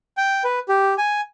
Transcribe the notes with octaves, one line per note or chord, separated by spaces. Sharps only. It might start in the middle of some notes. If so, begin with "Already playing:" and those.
G5
B4
G4
G#5